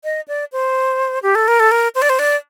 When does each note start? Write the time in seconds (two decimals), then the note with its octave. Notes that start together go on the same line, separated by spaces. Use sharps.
0.04 D#5
0.28 D5
0.52 C5
1.23 G4
1.35 A4
1.48 A#4
1.60 A4
1.71 A#4
1.95 C5
2.02 D5
2.09 C5
2.19 D5